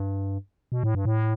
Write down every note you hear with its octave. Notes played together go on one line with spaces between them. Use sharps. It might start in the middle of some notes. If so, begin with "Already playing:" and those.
Already playing: G2
B2
A2
G2
A2